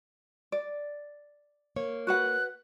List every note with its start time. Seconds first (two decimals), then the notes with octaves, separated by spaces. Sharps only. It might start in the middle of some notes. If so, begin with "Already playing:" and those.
0.52 D5
1.76 A#3 C#5
2.07 F#4 B4 F#5 F#6